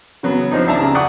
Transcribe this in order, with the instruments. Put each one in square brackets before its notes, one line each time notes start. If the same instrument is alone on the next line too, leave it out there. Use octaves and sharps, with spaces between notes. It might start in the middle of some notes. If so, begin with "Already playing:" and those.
[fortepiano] C#3 F#3 B3
F3 C4 D4 D#4
C#2 D4 E5 A5 A#5
C#3
D5 F#5 G5 C#6 D#6 F#6